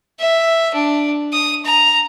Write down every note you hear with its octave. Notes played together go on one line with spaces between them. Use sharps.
E5
D4
D#6
A#5